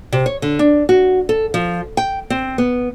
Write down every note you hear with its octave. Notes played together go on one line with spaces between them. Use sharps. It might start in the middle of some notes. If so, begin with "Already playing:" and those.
C3
C#5
D3
D4
F#4
A4
F3
G5
C4
B3